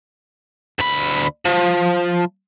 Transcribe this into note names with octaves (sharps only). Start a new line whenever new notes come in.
D2 B5
F3